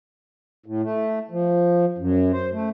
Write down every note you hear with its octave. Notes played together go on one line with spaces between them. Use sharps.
A2
A3
F3
F#2
C5
A3